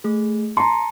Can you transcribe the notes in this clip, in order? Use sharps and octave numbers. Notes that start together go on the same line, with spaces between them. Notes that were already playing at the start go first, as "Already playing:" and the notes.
A3 G#4
A5 A#5 C6 C#7